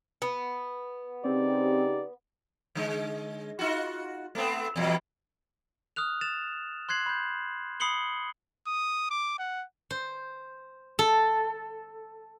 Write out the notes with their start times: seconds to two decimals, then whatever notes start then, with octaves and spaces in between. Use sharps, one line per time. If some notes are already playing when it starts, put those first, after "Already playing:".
0.22 B3
1.25 C#3 C4 D#4 G4 D5
2.75 D3 G#3
3.59 D#4 F4 F#4
4.35 A3 B3 C4
4.76 E2 B2 G3
5.96 D#6 F6 F#6 F7
6.21 A6 E7 F7
6.89 C6 F#6 G#6 C7 F#7
7.06 B5 G6
7.80 B5 D#6 C7 C#7 F#7 G7
8.67 D#6
9.10 D6
9.39 F#5
9.90 C5
10.99 A4